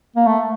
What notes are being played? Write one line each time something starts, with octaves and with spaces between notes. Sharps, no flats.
A#3
A3